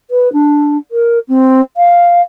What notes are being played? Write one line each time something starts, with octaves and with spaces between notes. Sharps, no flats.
B4
D4
A#4
C4
F5